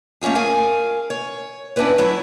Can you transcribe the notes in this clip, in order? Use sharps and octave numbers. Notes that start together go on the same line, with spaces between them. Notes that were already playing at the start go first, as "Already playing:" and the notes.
A3 A#3 C#4 F4 G#4
G#4 A#4 F5 G#5
C#5
B3 C#4 D4 E4 B4 C#5
F#3 A3 E4